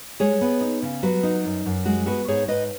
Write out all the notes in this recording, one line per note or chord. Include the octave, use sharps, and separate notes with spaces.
G#3 G#4 C#5
B3
D#4
C#3
F#3 F#4 B4
D#4
F#2
F#2
G#3 F#4
B3 F#4 B4
G#2 G#4 C#5
G#2 B4 D#5